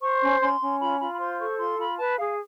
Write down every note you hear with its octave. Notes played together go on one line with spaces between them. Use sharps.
C5 C#6
C#4
C#4 C6
C#4
F4 B5
F4 B5
B5
C5 C6
A4 C#6
F4 C6
F4 B5
B4 A5
G#4 F5